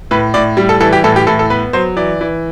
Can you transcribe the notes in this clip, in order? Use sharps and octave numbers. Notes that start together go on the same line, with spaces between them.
A2 B4
A2 D5
G3
A4
E3 A4
G4
A2 A4
G4
A2 A4
A4
B3 B4
F#3 C5
E3 D5
E3